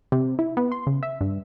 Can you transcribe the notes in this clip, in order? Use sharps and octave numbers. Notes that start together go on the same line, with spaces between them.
C3
E4
B3
C6
C#3
E5
G2